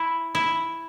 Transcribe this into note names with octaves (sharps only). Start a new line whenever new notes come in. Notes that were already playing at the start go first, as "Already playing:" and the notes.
Already playing: E4
E4